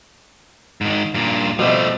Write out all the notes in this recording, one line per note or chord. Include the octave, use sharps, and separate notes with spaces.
G#2 D#3
G2 A#2
B2 F3 G3 A3 C4